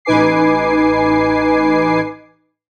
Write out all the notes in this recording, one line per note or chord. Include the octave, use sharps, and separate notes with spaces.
A1 D#4 B4 G#5 D6 C7